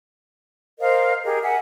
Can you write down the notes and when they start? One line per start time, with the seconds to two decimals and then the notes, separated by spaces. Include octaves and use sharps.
0.79 A#4 C5 D#5 F5
1.23 G4 G#4 A#4 D#5
1.42 A#4 E5 F#5 G#5